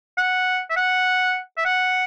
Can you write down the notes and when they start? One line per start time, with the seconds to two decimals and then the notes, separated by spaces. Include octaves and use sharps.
0.18 F#5
0.70 E5
0.77 F#5
1.57 E5
1.65 F#5